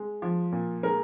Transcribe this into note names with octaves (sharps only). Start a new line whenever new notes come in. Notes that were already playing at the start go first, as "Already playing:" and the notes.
Already playing: G#3
F3
A#2
G#3 A#4